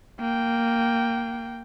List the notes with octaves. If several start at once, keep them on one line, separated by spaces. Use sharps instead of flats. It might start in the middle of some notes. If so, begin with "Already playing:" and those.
A#3 G5